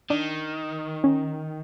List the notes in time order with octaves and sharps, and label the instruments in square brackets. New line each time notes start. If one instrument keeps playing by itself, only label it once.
[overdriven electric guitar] D#3 [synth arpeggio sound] D4
[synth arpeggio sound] C#4